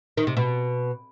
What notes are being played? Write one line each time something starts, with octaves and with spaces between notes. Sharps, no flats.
D#3
C3
B2